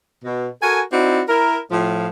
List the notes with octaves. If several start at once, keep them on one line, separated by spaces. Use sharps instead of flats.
B2
F#4 A4 A#4 G#5
C4 D#4 E4 F#4 D5
E4 A#4
A2 F3